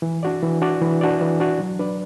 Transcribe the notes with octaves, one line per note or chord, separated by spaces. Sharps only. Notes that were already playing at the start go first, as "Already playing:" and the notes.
E3
D4 F#4 D5
E3
D4 F#4 D5
E3
D4 F#4 D5
E3
D4 F#4 D5
F#3
D4 B4 D5